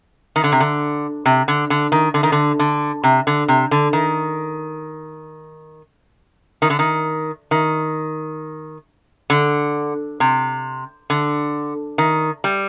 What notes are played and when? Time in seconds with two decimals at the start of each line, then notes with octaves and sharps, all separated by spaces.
0.36 D#3
0.44 D3
0.52 C3
0.60 D3
1.26 C3
1.48 D3
1.70 D3
1.92 D#3
2.14 D3
2.23 D#3
2.32 D3
2.59 D3
3.04 C3
3.27 D3
3.48 C3
3.71 D3
3.93 D#3
6.62 D#3
6.70 D3
6.79 D#3
7.51 D#3
9.30 D3
10.20 C3
11.10 D3
11.98 D#3
12.44 G3